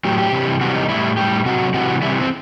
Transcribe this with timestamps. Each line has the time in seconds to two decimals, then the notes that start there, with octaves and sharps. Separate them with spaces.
0.04 A2 F#3 G4
0.18 G4
0.32 C3 E3 G3
0.61 C3 E3 G3 F#4
0.75 D#4
0.89 A2 G3 E4
1.17 A2 G3 G4
1.45 C3 F#3 F#4
1.74 C3 E3 G3 F#4
2.02 G3 E4
2.05 C3 E3
2.21 C4